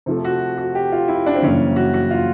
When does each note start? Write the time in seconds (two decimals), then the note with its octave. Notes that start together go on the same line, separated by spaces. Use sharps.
0.06 C3 F3 A3
0.24 F#4
0.58 F#4
0.75 G4
0.92 F4
1.08 E4
1.26 D4
1.35 C4
1.43 F#2 C#3 E3 G3 A#3 C#4
1.76 F#4
1.94 F#4
2.11 F4